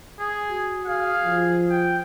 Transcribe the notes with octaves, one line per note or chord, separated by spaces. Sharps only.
G#4
F#4
G#4 F5
F3
G5